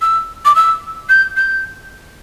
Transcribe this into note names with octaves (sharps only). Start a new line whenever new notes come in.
E6
D6
E6
G6
G6